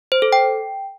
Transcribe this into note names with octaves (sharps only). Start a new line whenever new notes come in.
C5
A4
G5